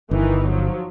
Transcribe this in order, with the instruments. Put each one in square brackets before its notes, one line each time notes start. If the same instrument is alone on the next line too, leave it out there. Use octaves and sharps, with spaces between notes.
[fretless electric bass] G1 [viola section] D#3 E3 D#4
[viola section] F3 F#3